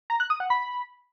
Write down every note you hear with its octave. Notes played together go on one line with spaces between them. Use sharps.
A#5
F#6
D#6
F#5
B5